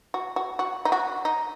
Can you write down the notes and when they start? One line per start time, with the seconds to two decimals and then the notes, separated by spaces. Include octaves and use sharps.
0.14 F#4
0.36 F#4
0.59 F#4
0.85 D#4
0.92 F#4
1.25 D#4